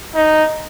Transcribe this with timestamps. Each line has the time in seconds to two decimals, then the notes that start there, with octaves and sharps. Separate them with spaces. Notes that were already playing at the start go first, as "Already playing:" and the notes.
0.16 D#4